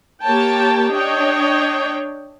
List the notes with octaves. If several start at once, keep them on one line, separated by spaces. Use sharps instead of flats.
A#3 G4 C#5 G5 A5
D4 C#5 D#5 G5